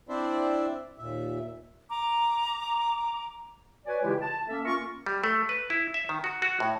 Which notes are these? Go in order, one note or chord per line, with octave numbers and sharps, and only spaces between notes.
C4 D4 E4 C5 D5 E5
D#2 A#2 E5
A#5 D6
F#4 B4 C#5 D5 G#5
C#3 E3 G#3 E4 F4 G4
A5
A#3 C#4 A4 E5
A#3 C#4 F4 A#4 C#6
G3
A3
B4
E4
E5
D#3
F#4
F#4
A2